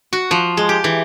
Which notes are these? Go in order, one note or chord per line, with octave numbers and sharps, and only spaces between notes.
F#4
F3
G#3
G4
E3